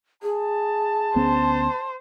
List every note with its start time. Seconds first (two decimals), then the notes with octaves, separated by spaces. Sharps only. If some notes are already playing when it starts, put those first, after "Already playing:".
0.23 G#4 A5
1.16 D2 B3 C#4 C5